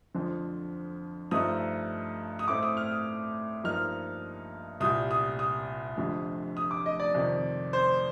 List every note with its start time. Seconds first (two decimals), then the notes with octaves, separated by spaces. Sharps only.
0.14 F2 D3 F3
1.31 G2 F3 A3 D#4 D#6
2.39 D#6
2.48 A2 A3 C4 D6
2.63 D#6
2.77 F6
2.92 D#6
3.64 G2 F3 A#3 D#4 F6
4.80 C2 A#2 G3 D#6
5.11 D#6
5.39 D#6
5.97 F1 F2 D3 G3
6.57 D#6
6.71 D6
6.86 D#5
7.00 D5
7.14 F2 C3 D#3
7.73 C5